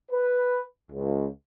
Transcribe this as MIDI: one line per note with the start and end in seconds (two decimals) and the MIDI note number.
0.11 0.60 71
0.90 1.26 37